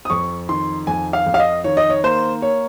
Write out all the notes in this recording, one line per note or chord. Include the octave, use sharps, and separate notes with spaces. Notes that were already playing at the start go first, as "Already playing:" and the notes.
D#6
F2 C#6
D#3 C6
F2 G#5
F5
F2
F5
D#5
D#3 C#5
D#5
C#5
A#3 C5
A#3 C#5